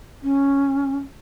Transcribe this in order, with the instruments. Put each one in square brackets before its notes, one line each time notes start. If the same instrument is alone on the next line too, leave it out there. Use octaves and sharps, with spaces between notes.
[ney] C#4